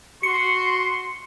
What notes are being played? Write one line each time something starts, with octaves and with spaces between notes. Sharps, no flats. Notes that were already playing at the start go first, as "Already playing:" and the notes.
F#4 C6 C#7